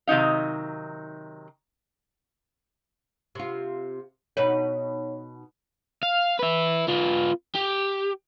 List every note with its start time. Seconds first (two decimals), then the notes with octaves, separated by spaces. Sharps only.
0.07 C3 D#3 F#3 D#4 F5
3.35 C3 F4
4.37 B2 D#4 B4 C#5
6.03 F5
6.39 E4 B4
6.88 B3 F4
7.55 G4